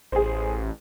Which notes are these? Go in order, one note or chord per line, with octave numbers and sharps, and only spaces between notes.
A1 G#4 C5